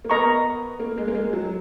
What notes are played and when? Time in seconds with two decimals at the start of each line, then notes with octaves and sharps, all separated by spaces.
0.05 A#3
0.09 B3 A#4 D#5 A#5 C#6
0.80 A#3
0.98 G#3
1.08 A#3
1.15 G#3
1.33 F#3